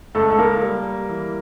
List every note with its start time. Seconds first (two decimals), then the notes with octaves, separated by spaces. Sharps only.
0.15 C#2 A3 A4
0.30 A4
0.38 A#3 A#4
0.63 G3
1.09 E3